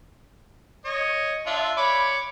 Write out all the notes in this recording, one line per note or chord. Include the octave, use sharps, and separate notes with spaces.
C#5 D#5
D4 F4 E5
C#5 B5 D6